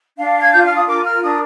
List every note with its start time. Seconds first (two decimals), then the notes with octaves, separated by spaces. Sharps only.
0.17 D4 F5
0.41 G#6
0.51 F4 G6
0.64 F6
0.75 D#6
0.87 A#4 D6
1.04 F6
1.22 D4 D#6